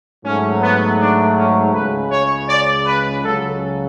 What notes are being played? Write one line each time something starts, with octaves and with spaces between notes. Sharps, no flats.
G#2 F#3 A3 C#4
B3
D4
C#4
C#2 C#3 G#3 B4
C#5
D5
B4
C#2 C#3 F#3 A4